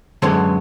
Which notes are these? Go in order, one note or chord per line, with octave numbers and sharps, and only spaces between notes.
F#2 D3 G#3 B3 C#5